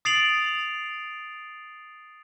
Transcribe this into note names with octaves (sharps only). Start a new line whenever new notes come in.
D#6 A6 C7 D7 F7 F#7